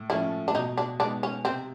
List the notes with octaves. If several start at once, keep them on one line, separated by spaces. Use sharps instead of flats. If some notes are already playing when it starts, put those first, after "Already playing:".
Already playing: A2
F3 A3 C#4 E4
D4
B2 D#4
D4
G#3 B3 D4 D#4
C#4
C3 C4